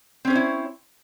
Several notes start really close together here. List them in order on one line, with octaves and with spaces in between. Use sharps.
C4 C#4 C5 C#5 E4